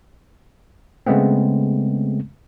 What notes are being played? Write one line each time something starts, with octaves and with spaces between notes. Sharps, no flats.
C#3 G#3 A3 B3 C4